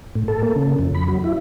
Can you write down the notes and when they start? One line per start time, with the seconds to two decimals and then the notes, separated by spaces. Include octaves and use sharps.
0.15 A2
0.28 A4
0.43 A#3
0.56 C#3
0.79 F2
0.94 B5
1.08 F#3
1.24 E4